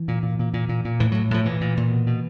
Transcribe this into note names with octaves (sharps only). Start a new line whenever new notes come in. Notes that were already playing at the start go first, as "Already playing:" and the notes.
Already playing: E3
A#2
A#2
A#2
A#2
A#2
A#2
A2 E3
A2 F#3
A2 F3
A#2 E3
A#2
A#2
B2
B2